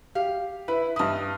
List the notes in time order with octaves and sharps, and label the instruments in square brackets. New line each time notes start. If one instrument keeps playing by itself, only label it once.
[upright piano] G4 [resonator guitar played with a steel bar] F5
[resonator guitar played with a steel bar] E4 [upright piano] B4
[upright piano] G2 D#6 [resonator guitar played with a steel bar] E4 D#5